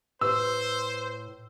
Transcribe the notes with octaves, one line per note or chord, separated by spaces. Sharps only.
A2 B4 C5 E6